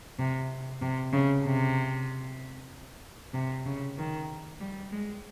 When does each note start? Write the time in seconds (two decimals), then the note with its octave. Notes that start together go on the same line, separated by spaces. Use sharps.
0.19 C3
0.82 C3
1.13 C#3
1.45 C3
3.34 C3
3.66 C#3
3.97 D#3
4.60 G3
4.92 G#3